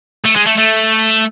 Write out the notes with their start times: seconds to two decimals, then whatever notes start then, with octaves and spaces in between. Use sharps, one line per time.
0.25 A3
0.36 G#3
0.47 A3
0.58 A3